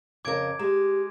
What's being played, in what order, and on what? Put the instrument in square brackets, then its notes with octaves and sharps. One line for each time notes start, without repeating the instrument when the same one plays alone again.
[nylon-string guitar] F2 C#3 A#4 [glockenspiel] D6 G#6 D7
[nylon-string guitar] G#3 [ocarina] G4 [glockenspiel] A#5